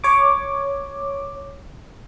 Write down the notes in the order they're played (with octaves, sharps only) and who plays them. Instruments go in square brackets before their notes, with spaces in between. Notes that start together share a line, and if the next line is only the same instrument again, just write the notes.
[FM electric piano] C#5 D6